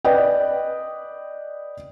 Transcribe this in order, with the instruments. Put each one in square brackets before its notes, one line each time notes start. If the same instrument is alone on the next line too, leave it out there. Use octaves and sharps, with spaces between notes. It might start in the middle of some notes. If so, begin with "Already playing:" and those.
[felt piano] B4 D5 D#5 G5